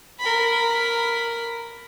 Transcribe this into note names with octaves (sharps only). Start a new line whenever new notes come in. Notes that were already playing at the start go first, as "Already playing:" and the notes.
A#4 B5